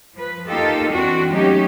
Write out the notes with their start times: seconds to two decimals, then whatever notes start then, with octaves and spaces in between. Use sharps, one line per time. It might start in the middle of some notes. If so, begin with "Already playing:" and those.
0.14 F3 B4
0.47 A#3 D#4 F4 G4 A4 D#5
0.91 E2 E3 C4 D4 F#4
1.31 F#3 G#3 A3 C#4 D#4 G4